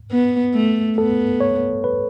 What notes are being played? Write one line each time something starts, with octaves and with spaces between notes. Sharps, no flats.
B3
A3
B3 A4
C#5
B4